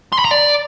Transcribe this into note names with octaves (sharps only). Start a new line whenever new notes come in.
C6
B5
A#5
D5